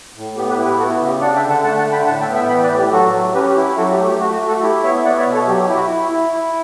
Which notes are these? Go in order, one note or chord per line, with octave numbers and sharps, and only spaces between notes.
A2
B3 G4
G4 B4
E4
G4 B4
B3 F#4 A4
F#4
C#3
G4
D4 D5 F#5
E5 G5
D3
F#5 A5
A3 F#5 A5
F#5 A5
D3
G5 B5
A2 F#5 A5
E5 G5
B3
E5 G5
E3 G5 B5
B4 D5
A2
G4
F#3 F#4 A4
F#3
C#4 G4 B4
G4
E4
F#3 F#4 A4
G4
A3
G4
A3 F#4
F#4
A3
F#4 A4
E4 G4
B3 C#5 E5
B3 D5 F#5
C#5 E5
B2
A4 C#5
F#3 G4
G4
E4
F#4
E4
E4
E4